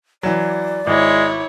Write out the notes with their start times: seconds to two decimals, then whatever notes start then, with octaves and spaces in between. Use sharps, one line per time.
0.23 E3 F#3 D5
0.87 G#1 G#3 E4 C#5